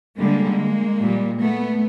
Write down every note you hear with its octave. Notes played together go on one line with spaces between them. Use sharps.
D3 G3 G#3 A#3
A#2 G3
A3 B3